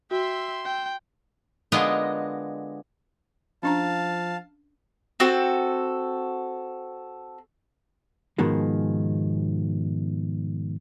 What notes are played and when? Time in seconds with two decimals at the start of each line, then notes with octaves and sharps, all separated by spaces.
0.11 F#4 E5 G5 C6 E6
0.65 G5
1.72 D3 G#3 B3 F4 A#4 D#5
3.63 F3 C#4 D4 F5 A5 A#5
5.20 C4 F#4 A4
8.38 G#2 B2 D#3 F3 G#3